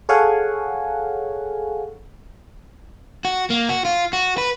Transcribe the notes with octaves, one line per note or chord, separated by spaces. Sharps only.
G#4 A4 C#5 F5 F#5 G#5
F#4
A#3
F#4
F4
F#4
B4